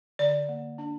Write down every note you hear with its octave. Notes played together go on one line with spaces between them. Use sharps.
D3 D5
A#3
D4